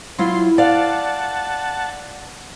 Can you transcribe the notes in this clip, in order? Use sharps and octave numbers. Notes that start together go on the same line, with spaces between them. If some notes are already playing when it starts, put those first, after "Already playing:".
F#3 E4 F4 C6
D5 F5 F#5 A5